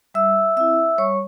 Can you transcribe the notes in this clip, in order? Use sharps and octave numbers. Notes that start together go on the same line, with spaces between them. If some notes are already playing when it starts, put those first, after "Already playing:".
G3 E5 E6
C4 E4 E5 E6
G3 C#5 C#6